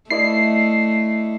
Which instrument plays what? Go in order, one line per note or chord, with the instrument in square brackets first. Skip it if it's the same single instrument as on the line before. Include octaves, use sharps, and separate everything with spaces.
[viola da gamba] A3 [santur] E4 D5 D#5 [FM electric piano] C7